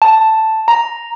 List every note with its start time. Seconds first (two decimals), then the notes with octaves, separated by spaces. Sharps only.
0.02 A5
0.68 A#5